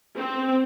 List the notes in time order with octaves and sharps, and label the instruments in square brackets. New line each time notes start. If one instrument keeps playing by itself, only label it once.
[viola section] C4